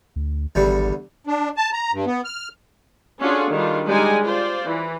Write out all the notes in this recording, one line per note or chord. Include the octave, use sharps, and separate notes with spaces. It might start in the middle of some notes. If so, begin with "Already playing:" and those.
D2
G#1 E2 D3 G3
D4
A5
A#5
G2
B3
F6
C#4 D4 F4 F#4 G#4 A4
D#3 G3 D4 F4
G3 G#3 D#4 G#5
F4 C5 D5
E3